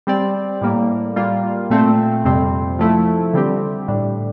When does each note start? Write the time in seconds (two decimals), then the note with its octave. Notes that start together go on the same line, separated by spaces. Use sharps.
0.07 G3 C4 G4 D5
0.61 A2 G3 A#3
1.16 G3 A#3 F4
1.70 A#2 A3 C4
2.25 F2 C3 G3 C4
2.79 F3 A3 E4
3.34 D3 G3 C4 G4
3.88 A2 G3 D4